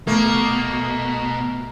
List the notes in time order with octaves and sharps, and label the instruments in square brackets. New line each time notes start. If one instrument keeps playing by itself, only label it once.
[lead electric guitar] B2 [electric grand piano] A3 [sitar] A#3